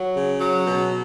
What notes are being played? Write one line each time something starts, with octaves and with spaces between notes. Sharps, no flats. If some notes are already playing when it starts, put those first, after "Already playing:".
Already playing: F#3
C#3
F#3
B2